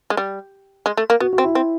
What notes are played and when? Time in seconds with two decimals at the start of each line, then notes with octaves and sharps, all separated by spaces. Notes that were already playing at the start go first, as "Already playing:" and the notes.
0.10 G#3
0.17 G3
0.86 G#3
0.97 A3
1.10 A#3
1.20 B3 F#4
1.33 F#4
1.38 C4
1.44 E4
1.55 C4